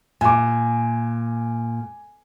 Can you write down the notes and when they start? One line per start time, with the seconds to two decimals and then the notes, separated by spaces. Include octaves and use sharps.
0.21 A#2 G#5 D6